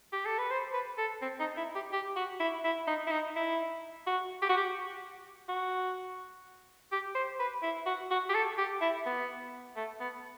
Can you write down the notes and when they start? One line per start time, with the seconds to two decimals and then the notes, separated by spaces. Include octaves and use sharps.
0.13 G4
0.26 A4
0.38 B4
0.50 C5
0.73 B4
0.98 A4
1.21 C4
1.40 D#4
1.57 E4
1.75 G4
1.93 G4
2.16 F#4
2.40 E4
2.64 E4
2.87 D#4
3.07 E4
3.11 D#4
3.36 E4
4.07 F#4
4.42 G4
4.49 F#4
4.57 G4
5.49 F#4
6.92 G4
7.15 C5
7.39 B4
7.63 E4
7.86 F#4
8.11 F#4
8.29 G4
8.35 A4
8.58 G4
8.81 E4
9.06 B3
9.76 A3
10.00 B3